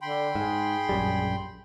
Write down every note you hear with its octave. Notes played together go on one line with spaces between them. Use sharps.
D3 G5 B5 C6
G#2 G#4
A#1 F#2 G3